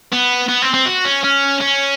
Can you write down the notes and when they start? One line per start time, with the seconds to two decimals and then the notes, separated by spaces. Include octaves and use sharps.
0.12 B3
0.48 B3
0.62 C4
0.74 C4
0.86 F#4
1.05 C#4
1.24 C#4
1.61 C#4